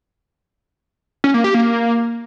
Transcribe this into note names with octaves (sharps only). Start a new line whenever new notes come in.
C#4
A#3
G4
A#3